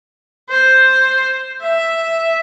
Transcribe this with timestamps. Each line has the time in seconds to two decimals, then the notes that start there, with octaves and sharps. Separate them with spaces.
0.50 C5
1.63 E5